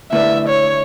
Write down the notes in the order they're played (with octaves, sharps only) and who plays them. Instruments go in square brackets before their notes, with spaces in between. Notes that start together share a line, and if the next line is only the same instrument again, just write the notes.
[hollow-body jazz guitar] D3 A3 E4 B4 D5 [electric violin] E5
[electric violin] C#5